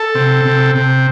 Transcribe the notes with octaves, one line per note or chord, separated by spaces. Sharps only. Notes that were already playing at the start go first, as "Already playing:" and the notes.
Already playing: A4
C3
C3
C3